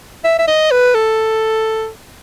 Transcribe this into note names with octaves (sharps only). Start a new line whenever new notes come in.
E5
E5
D#5
B4
A4